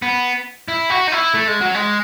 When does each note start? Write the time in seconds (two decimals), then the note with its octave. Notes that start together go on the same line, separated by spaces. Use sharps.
0.02 B3
0.68 E4
0.90 F#4
1.07 D#4
1.12 E4
1.34 A3
1.48 G#3
1.61 F#3
1.75 G#3